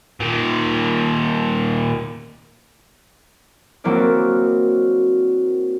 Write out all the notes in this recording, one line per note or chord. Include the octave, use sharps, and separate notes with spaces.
A#2 D#3
F#3 A#3 C4 E4 D5